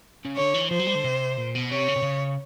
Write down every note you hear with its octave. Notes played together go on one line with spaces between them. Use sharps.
C#3
D3 C#5
E3
F3 C5
F#3
G3
D3
C3
A#2
B2
C3 C#5
C#3
C3
C#3